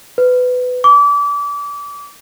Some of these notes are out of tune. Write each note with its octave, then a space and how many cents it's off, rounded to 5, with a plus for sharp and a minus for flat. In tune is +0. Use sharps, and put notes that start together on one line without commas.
B4 +20
D6 -30